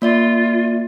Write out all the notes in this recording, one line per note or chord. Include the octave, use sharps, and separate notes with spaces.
A#3 F4 D5 E5